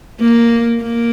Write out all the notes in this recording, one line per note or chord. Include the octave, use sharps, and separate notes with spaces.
A#3
A#3